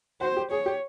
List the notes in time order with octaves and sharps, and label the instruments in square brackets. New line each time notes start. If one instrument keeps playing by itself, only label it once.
[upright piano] F#4 [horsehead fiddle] C5
[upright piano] G4
[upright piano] G#4 [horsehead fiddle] C#5
[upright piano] G4